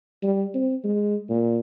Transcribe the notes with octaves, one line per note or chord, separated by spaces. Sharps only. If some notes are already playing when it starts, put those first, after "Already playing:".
G3
C4
G#3
A#2